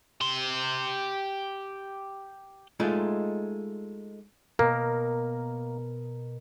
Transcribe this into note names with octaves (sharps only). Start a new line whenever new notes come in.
G4 C6
G#3 A3 D#4 F4
B2 A#3 A#4